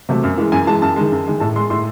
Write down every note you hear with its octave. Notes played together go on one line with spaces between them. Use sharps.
C3 F#3 A3
F#2
E3 G#3
F#2 G#5
E3 G#3 A5
F#2 A5
D#3 G#3
F#2
D#3 G#3
A2 A5
G#3 C6
A2 C6